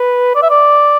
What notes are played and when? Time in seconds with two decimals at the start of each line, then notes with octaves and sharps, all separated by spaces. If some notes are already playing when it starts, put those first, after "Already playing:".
Already playing: B4
0.36 D5
0.42 E5
0.50 D5